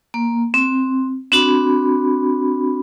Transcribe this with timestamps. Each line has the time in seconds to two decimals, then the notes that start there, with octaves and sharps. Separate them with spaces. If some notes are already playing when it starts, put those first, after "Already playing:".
0.14 A#3
0.54 C4
1.32 C4 D4 F#4 B5